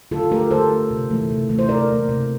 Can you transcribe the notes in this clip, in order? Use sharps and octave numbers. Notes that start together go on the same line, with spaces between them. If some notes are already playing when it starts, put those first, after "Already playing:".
D3 F4 A4
A3 G4 A#4
D3 A4 C5
A3
C3
E3 A3
C3
E3 A3
C5
C3 A#4 D5
E3 A#3
C3